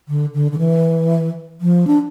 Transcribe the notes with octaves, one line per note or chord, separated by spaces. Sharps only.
D3
D3
D3
E3
F3
D4